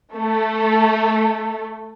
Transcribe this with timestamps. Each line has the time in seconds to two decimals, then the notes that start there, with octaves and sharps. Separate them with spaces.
0.15 A3 A4